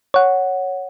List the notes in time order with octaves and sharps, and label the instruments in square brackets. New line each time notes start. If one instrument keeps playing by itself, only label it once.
[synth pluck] C#5 F#5